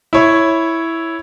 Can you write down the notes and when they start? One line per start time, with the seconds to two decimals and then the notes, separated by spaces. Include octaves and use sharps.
0.13 E4 C#5